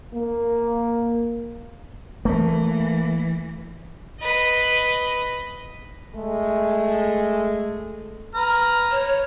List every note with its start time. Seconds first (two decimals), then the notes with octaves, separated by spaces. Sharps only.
0.14 A#3
2.25 E3 A3 A#3
4.20 B4 D#5
6.15 G#3 A3
8.34 B4 A#5 F6
8.91 C#5